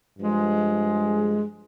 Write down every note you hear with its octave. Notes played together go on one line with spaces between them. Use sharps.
G2 F3 G#3